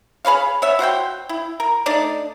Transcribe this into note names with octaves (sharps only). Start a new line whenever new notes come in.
G#4 B4 C#5 F5
B3 C#5 E5
F#4 C5 F#5 G5
E4
A#4
A3 D4 D#4 D5